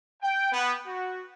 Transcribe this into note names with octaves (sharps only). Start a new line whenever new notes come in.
G5
B3
F#4